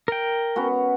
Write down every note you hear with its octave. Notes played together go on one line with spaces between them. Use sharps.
A#4 G5
B3 C#4 F#4